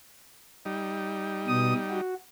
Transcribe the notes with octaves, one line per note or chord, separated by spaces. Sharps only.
G3 D#4
B2 D#6
F#4